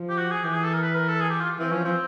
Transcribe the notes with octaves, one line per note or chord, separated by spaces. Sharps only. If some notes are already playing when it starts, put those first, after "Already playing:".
Already playing: F3
G4
F#4
G#4
E3 G4
G#4
A4
A#4
B4
A#4
A4
G#4
G4
F4
E3 C4
F3 C#4
F3 C4